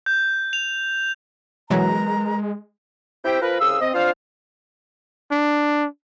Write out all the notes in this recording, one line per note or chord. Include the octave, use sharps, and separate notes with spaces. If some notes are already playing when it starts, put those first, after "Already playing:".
G6
F7
B2 E3 F#3 G#3 A#4 B4 A#5
C4 E4 G4 C5 E5 G5
F3 A#4 B4
C2 C#3 F5 D#6 E6
C4 D#5
C4 D4 F4 C5 F5
D4